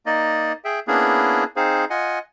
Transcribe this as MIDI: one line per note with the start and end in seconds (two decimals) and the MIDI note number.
0.06 0.52 58
0.06 0.52 63
0.06 0.52 74
0.06 0.52 75
0.65 0.79 68
0.65 0.79 76
0.65 0.79 79
0.87 1.44 58
0.87 1.44 59
0.87 1.44 61
0.87 1.44 62
0.87 1.44 64
0.87 1.44 68
1.56 1.85 60
1.56 1.85 63
1.56 1.85 68
1.56 1.85 72
1.56 1.85 77
1.90 2.19 65
1.90 2.19 75
1.90 2.19 78
1.90 2.19 80